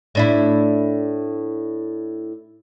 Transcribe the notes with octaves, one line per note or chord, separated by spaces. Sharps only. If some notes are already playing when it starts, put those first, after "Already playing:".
A2 D4 E4